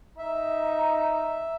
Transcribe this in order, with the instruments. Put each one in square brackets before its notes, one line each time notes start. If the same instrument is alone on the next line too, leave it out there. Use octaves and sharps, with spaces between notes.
[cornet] D#4 [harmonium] E5